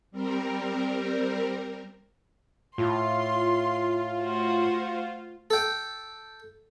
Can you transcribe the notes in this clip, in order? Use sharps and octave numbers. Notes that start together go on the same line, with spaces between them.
G3 C4 A#4
A2 F4 C6
A3 F#4 C5
A4 G5